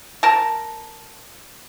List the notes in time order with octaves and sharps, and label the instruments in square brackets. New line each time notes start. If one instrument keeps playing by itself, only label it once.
[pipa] A#4 A5